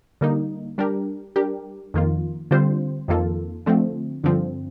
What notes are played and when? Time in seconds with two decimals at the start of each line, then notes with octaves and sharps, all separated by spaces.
0.21 D3 G3 A#3 D#4
0.78 G3 D4 G4 A#4
1.36 G3 D4 G4 A#4
1.94 F2 D#3 A#3 F4
2.51 D3 G3 C4 F4 C5
3.08 F2 D#3 A#3 F4 A4
3.66 D3 F3 A3 C4
4.24 G2 D3 F3 C4